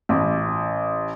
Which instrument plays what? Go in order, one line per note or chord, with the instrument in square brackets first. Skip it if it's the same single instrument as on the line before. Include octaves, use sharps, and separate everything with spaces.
[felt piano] A1